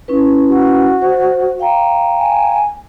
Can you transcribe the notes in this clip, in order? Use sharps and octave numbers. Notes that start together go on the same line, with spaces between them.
C#4 E4 B4
F#4
C5
F5 G5 A#5
G#5